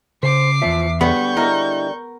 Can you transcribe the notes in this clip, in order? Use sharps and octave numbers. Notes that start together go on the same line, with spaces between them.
C#3 C5 D6 C7
E2 F3 C4 E5
D3 G3 B3 C#6 G6
E4 A#4 D#5 E5